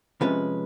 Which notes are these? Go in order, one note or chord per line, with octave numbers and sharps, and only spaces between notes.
C3 F3 G#3 C#4 B4